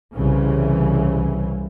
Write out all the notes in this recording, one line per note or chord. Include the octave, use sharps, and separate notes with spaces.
C2 C#3 E3